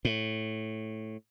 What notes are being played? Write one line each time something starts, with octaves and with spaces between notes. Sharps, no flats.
A2